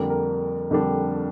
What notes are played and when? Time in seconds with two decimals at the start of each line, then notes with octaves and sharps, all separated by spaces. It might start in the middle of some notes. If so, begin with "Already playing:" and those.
Already playing: F2 D3 G3 A#3 D4 A#4
0.10 A#4
0.71 F2 D3 G3 A#3 D4